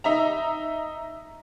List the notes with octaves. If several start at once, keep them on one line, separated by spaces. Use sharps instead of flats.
D#4 E5 A#5